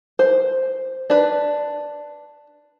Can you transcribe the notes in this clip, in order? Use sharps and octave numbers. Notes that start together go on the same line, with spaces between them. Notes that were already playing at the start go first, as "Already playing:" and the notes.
C5
D4 B4